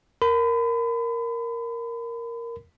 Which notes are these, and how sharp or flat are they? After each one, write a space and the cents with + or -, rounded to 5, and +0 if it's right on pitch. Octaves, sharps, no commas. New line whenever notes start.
A#4 +0 B5 +35